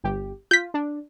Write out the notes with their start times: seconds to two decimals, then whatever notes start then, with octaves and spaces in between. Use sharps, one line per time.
0.04 G1 G4
0.51 F4 G6 B6
0.74 D4